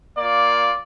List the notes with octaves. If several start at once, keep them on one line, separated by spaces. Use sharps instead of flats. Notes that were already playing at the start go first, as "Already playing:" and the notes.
A#3 F4 D5